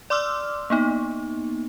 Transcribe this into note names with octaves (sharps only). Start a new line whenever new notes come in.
D5 C6 D6 E6 F6
A#3 B3 D#4